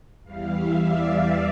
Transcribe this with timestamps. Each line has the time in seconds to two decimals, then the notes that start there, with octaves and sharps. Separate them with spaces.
0.24 E2 E3 G3 F5
0.53 E5
0.82 D5
1.12 E5